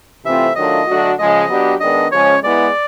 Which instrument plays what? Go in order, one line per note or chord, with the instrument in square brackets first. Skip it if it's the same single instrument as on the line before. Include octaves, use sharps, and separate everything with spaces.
[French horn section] C3 E3 A3 C4 F4 [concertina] E5
[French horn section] D#3 F#3 A3 D4 F4 [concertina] D#5
[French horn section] D3 F#3 A3 D4 F#4
[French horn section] C#3 F3 G#3 [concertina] D#5
[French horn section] F#3 B3 D4 G4
[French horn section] D#3 G#3 B3 D4 [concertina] D#5
[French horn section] C#3 F3 G#3 C#4 [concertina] C#5
[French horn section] G#3 B3 E4 [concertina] D5